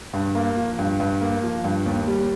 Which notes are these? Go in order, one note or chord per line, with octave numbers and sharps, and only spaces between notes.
G2
A#3
F3
G2
G2
A#3
F3
G2
D#2
G3